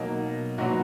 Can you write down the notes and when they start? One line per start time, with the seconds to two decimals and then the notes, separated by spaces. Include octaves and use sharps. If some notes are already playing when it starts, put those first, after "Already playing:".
Already playing: B2 F#3 A#3 D#4
0.58 A#2 F#3 B3 D#4 F#4